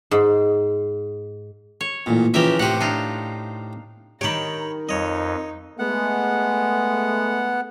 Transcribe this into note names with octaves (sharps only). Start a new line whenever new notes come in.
G#2
C#5
A1 A#2
C#3 E3 F3 G4 A#4 E5
A2 C3 G4 C5 F#5
D4 D#4 F4
D#3 G4 C#5 G5 A#5 B5
F2 D#4 C#5 D#5
G#3 A3 B3 F#5